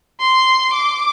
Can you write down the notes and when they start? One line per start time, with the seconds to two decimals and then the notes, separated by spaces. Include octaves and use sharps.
0.21 C6
0.74 D6